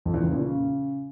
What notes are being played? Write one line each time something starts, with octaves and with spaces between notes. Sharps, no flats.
F2
E2
C#3
A#2
C#3